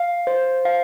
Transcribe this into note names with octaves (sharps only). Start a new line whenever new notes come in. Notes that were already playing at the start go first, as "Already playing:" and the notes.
Already playing: F5
C5
F5